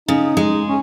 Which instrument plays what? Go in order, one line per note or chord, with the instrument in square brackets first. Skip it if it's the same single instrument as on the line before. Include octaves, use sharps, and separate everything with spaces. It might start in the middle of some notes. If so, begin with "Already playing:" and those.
[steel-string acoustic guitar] C#3 [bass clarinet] D#4
[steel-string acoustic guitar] G#3
[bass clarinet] C#4